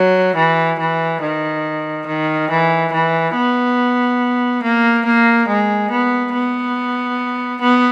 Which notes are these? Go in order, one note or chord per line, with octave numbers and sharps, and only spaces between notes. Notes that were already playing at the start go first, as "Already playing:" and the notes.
Already playing: F#3
E3
E3
D#3
D#3
E3
E3
B3
A#3
A#3
G#3
B3
B3
B3